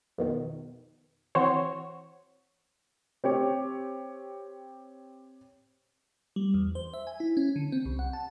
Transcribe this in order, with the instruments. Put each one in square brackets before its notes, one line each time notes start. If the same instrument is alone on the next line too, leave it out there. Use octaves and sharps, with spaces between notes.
[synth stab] F2 B2 D#3
E3 C4 F#4 C5 C#5
[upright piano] C4 G4 C#5
[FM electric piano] G3
E2
C5
E5
G#5
E4
C#4
D3
C4
C2
F#5
A5